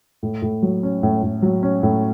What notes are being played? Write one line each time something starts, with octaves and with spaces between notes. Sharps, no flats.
A2
A2
F#3
C#4
A2
A2
F#3
C#4
A2